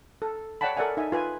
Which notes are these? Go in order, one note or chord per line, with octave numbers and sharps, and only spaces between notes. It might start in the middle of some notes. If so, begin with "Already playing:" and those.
A4
C#5 D5 F#5 G5 A5 B5
A4 A#4 D5 E5 F#5 G#5
D#4 E5 G#5
F4 B4 G#5